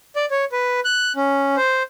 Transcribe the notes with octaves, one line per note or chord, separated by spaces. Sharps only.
D5
C#5
B4
F#6
C#4
C5